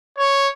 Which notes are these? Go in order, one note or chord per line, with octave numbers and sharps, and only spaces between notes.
C#5